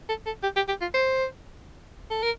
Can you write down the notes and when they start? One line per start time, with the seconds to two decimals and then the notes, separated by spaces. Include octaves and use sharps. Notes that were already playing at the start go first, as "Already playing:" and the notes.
0.09 A4
0.26 A4
0.43 G4
0.56 G4
0.68 G4
0.81 F4
0.94 C5
2.11 A4
2.23 A#4